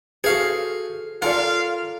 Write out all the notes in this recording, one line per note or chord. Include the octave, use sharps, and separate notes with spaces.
F#4 G#4 A4 C5 F5
F4 A4 A#4 D5 F5